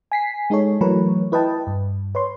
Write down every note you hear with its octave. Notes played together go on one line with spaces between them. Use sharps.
G#5 B6 C7
G#3 D#4 G#4 A4 C#5
E3 F#3 A3 A#4 B4 C#5
E4 B4 D#5 G5 A5
G2
B4 C#5 C6